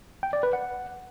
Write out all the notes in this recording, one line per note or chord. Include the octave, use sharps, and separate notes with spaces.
G5
D5
B4
F#5